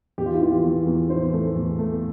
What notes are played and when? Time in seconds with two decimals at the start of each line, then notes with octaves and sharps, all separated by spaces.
0.18 E2 G4
0.26 F4
0.34 E4
0.41 E3 F4
0.63 E2
0.86 E2
1.10 E3 C5
1.33 A3
1.56 E2
1.79 A3